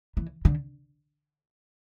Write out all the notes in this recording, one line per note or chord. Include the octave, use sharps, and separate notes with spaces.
E3
D3